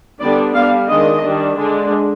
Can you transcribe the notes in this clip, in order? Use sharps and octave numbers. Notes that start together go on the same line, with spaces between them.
D3 G3 B3 D4 D5
G3 D4 F5
D#3 G#3 D4 D#5
D#3 G3 D4
D3 G#3 D4